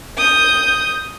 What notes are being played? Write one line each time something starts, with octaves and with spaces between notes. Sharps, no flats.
D#6 G6